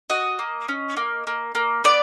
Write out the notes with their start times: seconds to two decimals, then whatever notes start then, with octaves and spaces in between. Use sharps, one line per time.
0.10 F#4 D#5
0.39 A#3
0.68 C#4
0.97 A#3
1.27 A#3
1.55 A#3
1.84 B3 D5